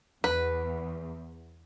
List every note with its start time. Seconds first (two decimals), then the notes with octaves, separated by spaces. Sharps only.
0.24 E2 B4